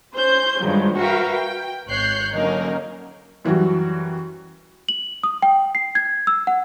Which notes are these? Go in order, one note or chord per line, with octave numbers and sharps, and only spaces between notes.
C#4 C5 G6
G2 D#3 F3 F#3 G#3
F#4 A#4 B4 E5 F5 G5
G5
G#1 C#5 F#6 G6 C7
D3 F#3 A#3 C#4 D#4 A#4
F#2 E3 F#3 G3 F#4
F#7
D#6
G5
C7
G#6
E6
F#5